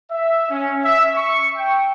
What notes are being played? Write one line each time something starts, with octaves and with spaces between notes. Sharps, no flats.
E5
C#4
E5
C#6
G5